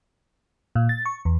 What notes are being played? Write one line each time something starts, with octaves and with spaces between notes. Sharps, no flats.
A#2
A6
C#6
E2